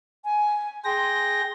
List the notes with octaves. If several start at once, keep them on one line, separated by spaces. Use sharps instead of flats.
G#5
G#4 G5 C6 A#6